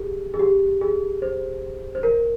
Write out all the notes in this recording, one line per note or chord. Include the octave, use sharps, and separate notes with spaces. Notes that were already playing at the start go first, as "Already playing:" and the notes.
Already playing: G4 G#4
G#4
G4
G#4
C5
C5
A#4